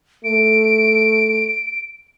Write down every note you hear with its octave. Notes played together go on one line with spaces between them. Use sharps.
A3 D7